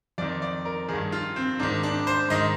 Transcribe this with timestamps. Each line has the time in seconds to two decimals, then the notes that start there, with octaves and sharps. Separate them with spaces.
0.18 F2 D#3 D5
0.42 D5
0.65 A#4
0.89 G2 D#3 G#4
1.12 F4
1.36 C4
1.59 G#2 D#3 D4
1.83 D4
2.07 C5
2.30 G#2 D#3 D#5